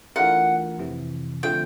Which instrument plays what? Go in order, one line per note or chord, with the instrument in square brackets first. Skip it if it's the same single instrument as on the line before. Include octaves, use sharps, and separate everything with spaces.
[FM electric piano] E3 A3 D4 F4 A#4 [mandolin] F#5
[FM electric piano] F2 C3 E3
[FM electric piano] D3 F3 A3 C4 [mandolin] G5